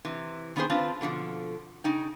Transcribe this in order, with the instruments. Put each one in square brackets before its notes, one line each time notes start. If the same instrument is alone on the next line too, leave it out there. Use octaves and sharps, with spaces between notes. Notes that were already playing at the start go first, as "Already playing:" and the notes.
[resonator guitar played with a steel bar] C3 E3
D#3 B3 C4 D4 G#4 C5
C4 D4 F4 B4 A5
B2 D3 E3 F3
C#3 D#4 G5